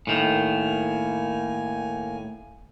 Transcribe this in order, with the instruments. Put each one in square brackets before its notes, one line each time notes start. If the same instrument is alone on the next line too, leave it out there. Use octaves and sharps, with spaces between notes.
[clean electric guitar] A2 D#3 [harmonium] A#3 G#5